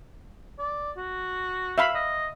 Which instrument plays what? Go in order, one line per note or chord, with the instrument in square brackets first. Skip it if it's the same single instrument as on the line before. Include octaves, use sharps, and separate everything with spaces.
[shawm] D5
F#4
[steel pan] E5 F5 B5
[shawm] D#5